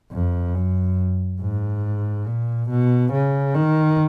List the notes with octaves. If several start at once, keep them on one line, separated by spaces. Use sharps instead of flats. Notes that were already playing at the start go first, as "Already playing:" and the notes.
F2
F#2
G#2
A#2
B2
C#3
D#3